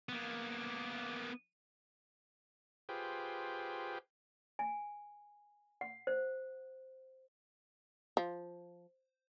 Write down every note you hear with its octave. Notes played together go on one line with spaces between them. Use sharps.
A#3 B3
F4 G4 G#4 B4 C5 G5
G#5
F#5
C5
F3